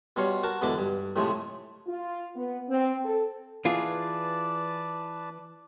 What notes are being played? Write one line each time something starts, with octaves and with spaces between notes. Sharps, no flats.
B2 G3 F4 C#5 C6
F#4 A#4 A5
E2 G#2 B2 D3 D4 D6
G2
A2 C3 F3 G#3 A3
F4
B3
C4
A4
E3 F4 G#4 B4 D5 A5